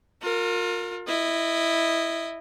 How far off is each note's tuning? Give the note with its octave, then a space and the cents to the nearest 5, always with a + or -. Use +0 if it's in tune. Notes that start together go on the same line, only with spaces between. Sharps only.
F4 +35 A#4 -20
E4 +0 D#5 -15